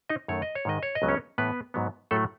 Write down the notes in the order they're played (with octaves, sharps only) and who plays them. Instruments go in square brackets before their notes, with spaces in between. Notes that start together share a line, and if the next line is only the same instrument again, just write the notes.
[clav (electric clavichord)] D#4 D#5
F#2 D#3 A3 C#5
D#5
C#5
G#2 D#3 G#3 D#5
C#5
D#5
C#2 C#3 F#3 B3
C#4 C#5
A2 E3 A3 B3 B4
G#2 F#3 B3
A2 F#3 A3 A4